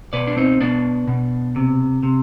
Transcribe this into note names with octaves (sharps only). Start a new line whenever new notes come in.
B2 B4 D5
D4
C4 D#4
B2 B3 D4
B2
C3
C3